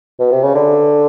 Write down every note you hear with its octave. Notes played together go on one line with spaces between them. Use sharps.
B2
C3
C#3
D3